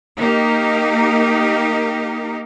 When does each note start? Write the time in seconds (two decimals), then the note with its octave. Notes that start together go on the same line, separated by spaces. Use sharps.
0.16 A#3 D#4 G4 A#4